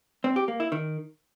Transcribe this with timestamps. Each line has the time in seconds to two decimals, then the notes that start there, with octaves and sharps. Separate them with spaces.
0.24 C4
0.36 G4
0.48 A#3
0.60 E4
0.72 D#3